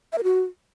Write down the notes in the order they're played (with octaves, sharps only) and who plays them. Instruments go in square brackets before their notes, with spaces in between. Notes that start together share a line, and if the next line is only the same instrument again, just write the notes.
[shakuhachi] E5
A#4
F#4